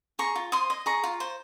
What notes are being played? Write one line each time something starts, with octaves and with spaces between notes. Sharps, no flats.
G#4 A#5 C#6
F4
C5 C6 D#6
D#5
G#4 A#5 C#6
F4
C5